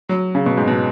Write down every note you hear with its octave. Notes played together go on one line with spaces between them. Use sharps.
F#3
C#3
B2
G#2
B2